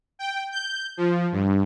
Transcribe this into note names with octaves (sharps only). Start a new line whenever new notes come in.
G5
G6
F3
G2